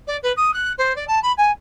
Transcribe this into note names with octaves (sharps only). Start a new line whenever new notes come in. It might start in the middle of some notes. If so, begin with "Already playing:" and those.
D5
B4
D#6
F#6
C5
D5
A5
B5
G#5